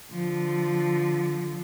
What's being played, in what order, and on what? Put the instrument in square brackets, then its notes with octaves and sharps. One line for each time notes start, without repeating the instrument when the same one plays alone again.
[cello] D3 F3